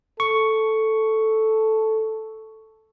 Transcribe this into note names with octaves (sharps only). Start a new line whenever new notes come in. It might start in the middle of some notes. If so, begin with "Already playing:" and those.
A4 C#6